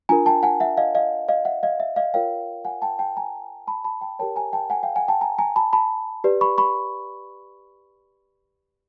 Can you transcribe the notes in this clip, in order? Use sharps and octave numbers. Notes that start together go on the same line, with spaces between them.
D4 F4 A#4 G#5 A#5
G5 A5
F#5 G#5
E5 F#5
D#5 F5
D#5 F5
D#5 F5
E5 F#5
D#5 F5
E5
D#5 F5
F4 A#4 C#5 F5 G5
F#5 G#5
G5 A5
G5 A5
G#5 A#5
A5 B5
A5 B5
G5 A5
G4 A#4 C#5 G5 A5
G#5 A#5
G5 A5
F#5 G#5
F5 G5
F#5 G#5
G5 A5
G#5 A#5
G#5 A#5
A5 B5
A5 B5
G4 B4 D5
B5 C#6
B5 C#6